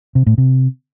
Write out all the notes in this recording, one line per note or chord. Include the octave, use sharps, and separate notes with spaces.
C3
A2
C3